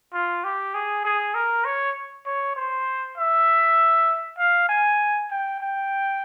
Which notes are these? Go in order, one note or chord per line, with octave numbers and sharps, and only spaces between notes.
F4
G4
G#4
G#4
A#4
C#5
C#5
C5
E5
F5
G#5
G5
G5